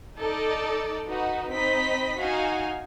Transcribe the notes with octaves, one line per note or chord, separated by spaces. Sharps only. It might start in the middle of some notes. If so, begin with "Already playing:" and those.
D#4 A4 D5
D#4 F#4 B4
C4 D#4 D#5 B5 B6
D#4 F#4 F5 G#5